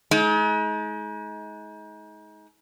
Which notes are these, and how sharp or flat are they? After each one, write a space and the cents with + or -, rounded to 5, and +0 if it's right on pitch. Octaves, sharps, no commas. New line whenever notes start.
G#3 +35 D#4 +35